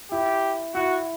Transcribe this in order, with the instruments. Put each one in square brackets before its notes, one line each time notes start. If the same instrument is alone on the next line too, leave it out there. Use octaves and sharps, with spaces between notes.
[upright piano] E4 [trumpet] G4
[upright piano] E4 [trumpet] F#4